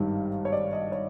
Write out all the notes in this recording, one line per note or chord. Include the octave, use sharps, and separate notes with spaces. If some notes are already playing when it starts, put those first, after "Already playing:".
Already playing: G#1 G2 D#3 G3
C#5
D5
D#5
C#5